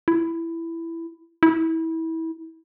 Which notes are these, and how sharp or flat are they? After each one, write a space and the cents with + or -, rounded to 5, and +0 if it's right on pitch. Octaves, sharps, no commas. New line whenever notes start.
E4 +10
E4 -25